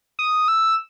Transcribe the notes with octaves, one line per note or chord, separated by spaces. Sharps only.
D#6
E6